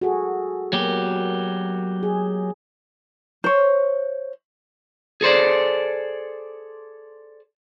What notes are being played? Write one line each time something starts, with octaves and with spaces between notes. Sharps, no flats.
F#4 G#4 A4
F#3 A#3 B3 G4
G#4
C5 C#5
G#4 A4 C5 D5